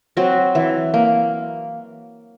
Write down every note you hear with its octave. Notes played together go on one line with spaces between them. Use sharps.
F#3 C4 F#4
E3
A#3